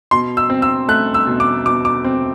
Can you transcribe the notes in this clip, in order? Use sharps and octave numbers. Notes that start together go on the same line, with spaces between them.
B2 C6
E6
C4
E6
A3 F#6
E6
B2
D6
B2 D6
D6
C4